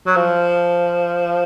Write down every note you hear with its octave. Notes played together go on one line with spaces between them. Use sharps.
F#3
F3